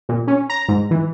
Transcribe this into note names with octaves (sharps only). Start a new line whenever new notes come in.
A#2
C#4
A#5
G#2
E3